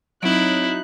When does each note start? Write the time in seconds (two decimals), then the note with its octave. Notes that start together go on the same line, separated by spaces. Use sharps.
0.23 F#3 C4 D#4 E4 F#6 G6 D7